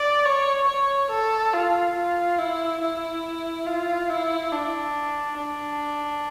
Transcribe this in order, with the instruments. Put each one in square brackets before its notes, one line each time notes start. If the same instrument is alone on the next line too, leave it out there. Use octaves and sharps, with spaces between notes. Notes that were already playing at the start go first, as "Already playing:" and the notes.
Already playing: [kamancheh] D5
C#5
C#5
A4
F4
F4
E4
E4
F4
E4
D4
D4